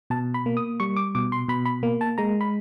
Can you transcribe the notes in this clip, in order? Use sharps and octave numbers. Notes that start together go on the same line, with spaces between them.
B2 A5
B5
A#3
D#6
G3 C#6
D6
B2 D6
C6
B2 B5
B5
A#3
A5
G#3 A#5
B5